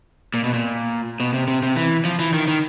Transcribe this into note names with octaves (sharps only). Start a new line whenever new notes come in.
A#2
B2
A#2
B2
C3
C3
C3
E3
F3
E3
D#3
D#3